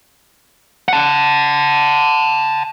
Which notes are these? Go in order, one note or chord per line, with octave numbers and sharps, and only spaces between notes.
F#5 A5